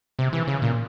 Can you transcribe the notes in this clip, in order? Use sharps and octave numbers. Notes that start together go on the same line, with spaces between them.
C3
E3
C#3
A#2